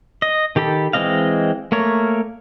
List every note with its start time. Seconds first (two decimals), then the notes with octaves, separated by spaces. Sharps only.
0.22 D#5
0.56 D#3 G4 A4 B5
0.93 E3 G#3 C4 D#5 F5
1.72 A3 A#3 A#4 C#5